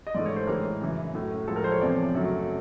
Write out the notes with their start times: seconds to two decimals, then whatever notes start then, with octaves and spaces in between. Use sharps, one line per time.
0.07 D#5
0.15 G#2 E3 A3 D5
0.26 C#5
0.36 C5
0.47 A2 E3 G#3 A#4
0.81 F#2 C#3 E3
1.14 A2 F#3 A3
1.47 A2 F3 G#3 A4
1.56 A#4
1.64 C5
1.72 C#5
1.80 E2 C3 F3 D5
2.14 F#2 C#3 F#3 A3